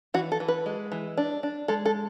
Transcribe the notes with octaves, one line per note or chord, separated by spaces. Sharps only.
E3 F#4
A4
E3
B4
G#3
E3
D4
D4
G#3 A4
A4